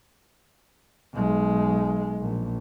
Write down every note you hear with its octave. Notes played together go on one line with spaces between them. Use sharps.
B1 G#3
A#1